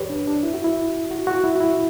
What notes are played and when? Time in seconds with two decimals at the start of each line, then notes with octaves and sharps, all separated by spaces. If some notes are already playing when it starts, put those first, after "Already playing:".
Already playing: G4 B4 C#5 D5
0.10 D4
0.27 D4
0.43 E4
0.54 F#4
0.64 E4
1.11 F#4
1.27 F#4
1.44 E4
1.55 F#4
1.60 E4